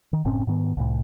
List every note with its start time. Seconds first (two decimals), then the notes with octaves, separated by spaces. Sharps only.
0.13 D#3
0.25 F#1 A2 C4 C#4
0.47 G#2 D#3 B3
0.77 C2 A2